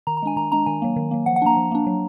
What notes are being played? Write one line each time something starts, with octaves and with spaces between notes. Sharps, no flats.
D#3 A#5
A#5
G#3 D4 G#5
D#3 A#5
G#3 D4 A#5
D#3 G#5
F#3 A#3
D#3
F#3 A#3
F3 F#5
F#5
A#3 D4 A#5
F3
A#3 D4
F#3